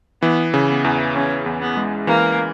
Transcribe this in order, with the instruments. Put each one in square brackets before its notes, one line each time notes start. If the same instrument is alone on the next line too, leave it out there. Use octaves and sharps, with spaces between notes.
[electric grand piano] E3 [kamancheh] B3
[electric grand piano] C#3
[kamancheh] B3
[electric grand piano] E2
[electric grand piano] E2 [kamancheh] C#4
[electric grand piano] E2
[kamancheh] B3
[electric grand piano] G#3
[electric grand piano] E3 [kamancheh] A#3